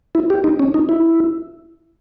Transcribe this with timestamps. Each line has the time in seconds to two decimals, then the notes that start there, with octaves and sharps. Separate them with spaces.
0.15 E4
0.30 G4
0.44 D#4
0.59 C#4
0.74 D#4
0.89 E4